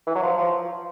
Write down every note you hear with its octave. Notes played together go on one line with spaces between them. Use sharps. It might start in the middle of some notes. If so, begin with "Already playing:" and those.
E3
F#3
F3
F3